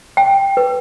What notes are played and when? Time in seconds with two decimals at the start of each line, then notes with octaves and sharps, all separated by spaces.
0.17 G5
0.57 B4